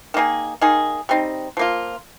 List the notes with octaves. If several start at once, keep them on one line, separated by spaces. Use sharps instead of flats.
D#3 A#3 D#4 G#4
D#3 A#3 D#4 G#4
G3 C4 D#4
F3 A#3 F4